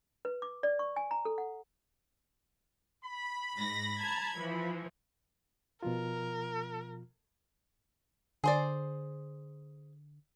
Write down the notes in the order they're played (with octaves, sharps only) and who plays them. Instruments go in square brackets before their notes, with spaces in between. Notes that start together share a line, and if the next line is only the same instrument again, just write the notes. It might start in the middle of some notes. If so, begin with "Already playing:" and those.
[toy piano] B4
D6
D5
C#6
G#5
A#5
A4
F#5
[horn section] B5
[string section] G#2 A#6
A5 A#5 G#6
E3 F3
[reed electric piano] B2 F3 F4 [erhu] A#4
[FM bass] D3 [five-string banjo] G#4 C5 D5